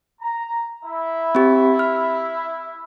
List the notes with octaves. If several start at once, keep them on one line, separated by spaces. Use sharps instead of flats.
A#5
E4
C4 G4
F6